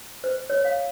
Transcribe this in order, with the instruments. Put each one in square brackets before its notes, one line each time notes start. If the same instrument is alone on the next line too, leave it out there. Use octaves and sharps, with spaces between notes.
[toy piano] C5
C#5
F5